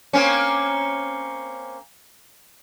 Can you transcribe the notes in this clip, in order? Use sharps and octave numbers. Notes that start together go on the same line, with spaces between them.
A#3 C4 C#4